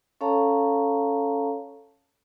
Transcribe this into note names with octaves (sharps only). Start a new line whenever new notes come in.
C#4 A4 C#5 F5 A5 A#5